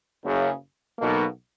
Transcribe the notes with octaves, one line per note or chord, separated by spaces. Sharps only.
F#1 F#2 C#3
B1 B2 A#3